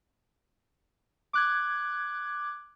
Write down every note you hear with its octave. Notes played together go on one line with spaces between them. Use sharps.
D6 F#6 G#6